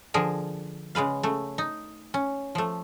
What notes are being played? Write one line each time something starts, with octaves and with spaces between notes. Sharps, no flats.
D3 F3 G#4 A#4
C#3 G#3 B4 F5
C#3 A3
D#4
C#4
F3 A3